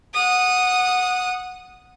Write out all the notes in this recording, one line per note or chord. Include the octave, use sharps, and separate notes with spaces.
F#5 D#6